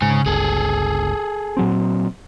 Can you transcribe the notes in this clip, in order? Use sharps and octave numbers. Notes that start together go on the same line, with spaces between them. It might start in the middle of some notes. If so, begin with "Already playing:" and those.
G#2 C#3 G#5
G1 C#2 G#4 A4
A#2 F#3 C4